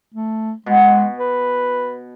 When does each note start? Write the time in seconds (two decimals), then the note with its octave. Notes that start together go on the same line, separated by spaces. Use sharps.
0.14 A3
0.66 B2 G#3
1.18 B4